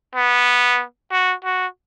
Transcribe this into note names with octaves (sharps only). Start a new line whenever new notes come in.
B3
F#4
F#4